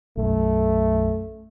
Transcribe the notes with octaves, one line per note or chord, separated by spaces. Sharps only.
B1 F#2 A3